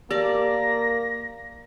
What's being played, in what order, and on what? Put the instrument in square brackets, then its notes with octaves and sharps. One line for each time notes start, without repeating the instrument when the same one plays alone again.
[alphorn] A#3 [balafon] G4 [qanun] D5 A5 [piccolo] A#6